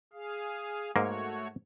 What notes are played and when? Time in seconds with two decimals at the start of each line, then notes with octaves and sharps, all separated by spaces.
0.13 G#4 F5
0.96 G#2 A3 A#3 F#4 C#5